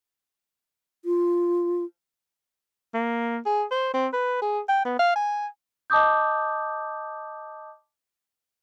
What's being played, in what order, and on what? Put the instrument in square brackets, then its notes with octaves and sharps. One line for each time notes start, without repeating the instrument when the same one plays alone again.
[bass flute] F4
[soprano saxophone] A#3
G#4
C5
C4
B4
G#4
G5
B3
F5
G#5
[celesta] D#5 A5 D6 D#6 G6